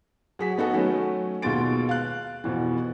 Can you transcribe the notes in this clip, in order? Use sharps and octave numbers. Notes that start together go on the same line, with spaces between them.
F#3 G#4 B6
B3 D#4 F#4 A4
D#3 F#3 A3 C#4
D#2 B2 G#3 F4 A6 D7
F5 F#6
F2 B2 E3